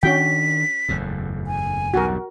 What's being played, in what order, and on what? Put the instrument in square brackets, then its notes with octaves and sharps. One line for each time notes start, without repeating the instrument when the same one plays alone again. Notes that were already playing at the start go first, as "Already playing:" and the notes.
[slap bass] D#3 D4 [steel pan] C#4 F#4 G5 [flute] B6
[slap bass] F#1 E2 A2
[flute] G#5
[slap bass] B1 E2 G2 [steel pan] F#4 A#4